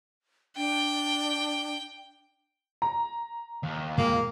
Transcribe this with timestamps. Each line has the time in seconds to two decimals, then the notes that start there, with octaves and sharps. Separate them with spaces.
0.57 D4 G5
2.82 A#5
3.63 D#2
3.98 A#2 G#3 A#3